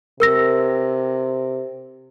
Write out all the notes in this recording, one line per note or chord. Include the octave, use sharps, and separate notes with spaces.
C3 A#4 E6 A#6